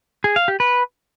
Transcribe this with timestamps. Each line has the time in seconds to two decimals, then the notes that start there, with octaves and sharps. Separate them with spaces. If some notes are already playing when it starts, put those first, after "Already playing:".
0.24 G#4
0.36 F5
0.48 G4
0.60 B4